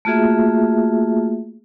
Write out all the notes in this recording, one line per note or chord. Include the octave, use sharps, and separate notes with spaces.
A3 A#3 F4 F#4 G#4 E5